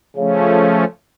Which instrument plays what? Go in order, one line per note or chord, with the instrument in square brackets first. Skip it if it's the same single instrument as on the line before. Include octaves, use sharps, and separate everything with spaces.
[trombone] C#3 [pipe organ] F3 A3 C#4